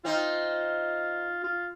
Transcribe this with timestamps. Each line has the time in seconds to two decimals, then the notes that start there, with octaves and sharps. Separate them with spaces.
0.05 C4 D#4 F4
1.44 F4